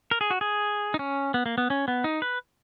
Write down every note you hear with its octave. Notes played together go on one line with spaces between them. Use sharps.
A#4
G#4
F#4
G#4
D#4
C#4
B3
A#3
B3
C#4
B3
D#4
B4